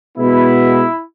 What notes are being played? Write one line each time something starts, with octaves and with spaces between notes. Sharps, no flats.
B2 G#3 B3 E4